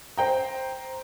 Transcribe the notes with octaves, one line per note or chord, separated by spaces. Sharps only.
C5 G5 A#5